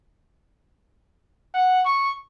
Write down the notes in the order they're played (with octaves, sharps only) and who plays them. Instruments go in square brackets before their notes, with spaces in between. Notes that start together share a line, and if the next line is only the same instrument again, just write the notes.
[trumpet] F#5
C#6